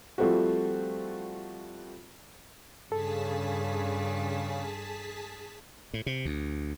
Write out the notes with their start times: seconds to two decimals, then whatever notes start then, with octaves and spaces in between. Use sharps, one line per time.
0.18 F3 G3 A3 C4 F#4
2.92 G2 C#3 G#4 A4 A5 B6
5.94 A2
6.06 C3
6.25 D2